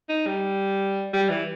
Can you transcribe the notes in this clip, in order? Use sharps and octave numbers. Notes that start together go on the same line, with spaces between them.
D#4
G3
G3
E3